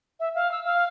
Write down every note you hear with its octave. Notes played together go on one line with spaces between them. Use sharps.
E5
F5
E6
F5